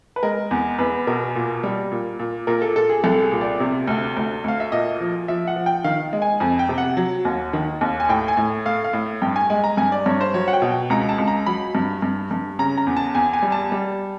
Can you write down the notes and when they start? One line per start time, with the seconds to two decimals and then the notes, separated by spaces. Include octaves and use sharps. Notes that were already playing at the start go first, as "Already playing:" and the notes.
0.16 B4
0.23 G#3 A#4
0.51 E2
0.78 E2 B4
1.07 B2 A#4
1.35 A#2
1.64 G3
1.92 A#2
2.19 A#2
2.47 A#2 A#4
2.62 A4
2.76 A#2 A4
2.89 G#4
3.04 C2 A4
3.22 G#4
3.32 A#2
3.41 D5
3.60 C3
3.87 D2
4.17 D2
4.44 D2 F5
4.60 E5
4.72 A#2 D#5
5.00 F3
5.28 F3 E5
5.47 F#5
5.56 F3
5.66 G5
5.84 D#3 F5
6.13 G#3
6.22 G#5
6.40 F2 G#5
6.59 G5
6.69 C3
6.78 F#5
6.97 F#3
7.25 D#2
7.53 D#3
7.81 D#2
8.00 G#5
8.09 A2 G5
8.28 G#5
8.37 A2
8.65 A3 F5
8.84 F5
8.93 A2
9.22 G2 G5
9.36 G#5
9.50 G#3 G#5
9.64 A#5
9.77 G2 G#5
9.92 D5
10.06 G2 C#5
10.21 C5
10.34 F#3 C#5
10.48 F#5
10.53 G5
10.62 B2
10.71 G5
10.90 C#2 A#5
11.09 A5
11.18 C#2
11.28 A#5
11.46 F#3 B5
11.75 G2
12.02 G2
12.31 G2
12.59 C#3 A#5
12.78 A#5
12.87 E2
12.97 A5
13.15 E2 G#5
13.33 G#5
13.42 G3
13.52 A5
13.72 G3